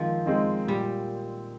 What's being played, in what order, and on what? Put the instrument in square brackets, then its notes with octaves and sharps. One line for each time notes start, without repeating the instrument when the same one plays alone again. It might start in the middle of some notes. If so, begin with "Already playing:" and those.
Already playing: [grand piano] D#3 G#3 C4 D#4 [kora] F3
[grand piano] G#3 C4 D#4
[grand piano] A#2 [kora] G3